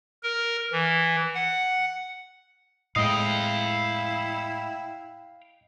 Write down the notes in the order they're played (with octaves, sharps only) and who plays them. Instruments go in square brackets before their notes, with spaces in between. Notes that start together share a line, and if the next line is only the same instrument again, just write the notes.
[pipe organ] A#4
E3
F#5
[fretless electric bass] A2 G#3 [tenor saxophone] E4 [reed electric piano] D#5 D#6 [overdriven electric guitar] F5 G5